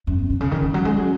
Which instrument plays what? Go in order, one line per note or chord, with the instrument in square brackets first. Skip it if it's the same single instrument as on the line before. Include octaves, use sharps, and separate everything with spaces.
[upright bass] F#2 [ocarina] C#4
[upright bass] F#2 [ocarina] B3
[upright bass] B2 [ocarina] C#4
[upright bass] C#3 [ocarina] C#4
[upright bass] D#3
D#3
F#3
G#3
F#3